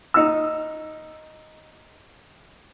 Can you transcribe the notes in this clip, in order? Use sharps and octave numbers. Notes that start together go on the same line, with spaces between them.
D#4 E6